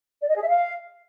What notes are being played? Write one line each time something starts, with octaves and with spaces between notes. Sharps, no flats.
D5
D#5
G#4
E5
F5